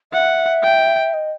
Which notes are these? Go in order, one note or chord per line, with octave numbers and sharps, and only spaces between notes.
E5 F#5
G5
D#5